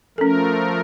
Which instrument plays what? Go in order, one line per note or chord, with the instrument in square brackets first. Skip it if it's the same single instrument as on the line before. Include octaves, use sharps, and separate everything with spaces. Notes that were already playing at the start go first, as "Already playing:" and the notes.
[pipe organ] F3 A3 A#4 [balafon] C#4 A4